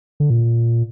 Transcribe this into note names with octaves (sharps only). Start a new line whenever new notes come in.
D3
A#2